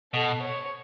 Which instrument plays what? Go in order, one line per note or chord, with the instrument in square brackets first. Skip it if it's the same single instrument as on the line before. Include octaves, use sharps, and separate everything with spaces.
[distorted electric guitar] B2 [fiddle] A4
[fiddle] C#5